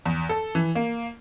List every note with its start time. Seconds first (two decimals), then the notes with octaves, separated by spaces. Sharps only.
0.06 E2
0.29 A4
0.55 E3
0.75 A#3